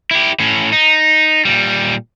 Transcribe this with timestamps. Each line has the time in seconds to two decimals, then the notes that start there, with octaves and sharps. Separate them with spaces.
0.11 E4 G4
0.40 A2 C#4
0.72 D#4
1.45 A#2 G3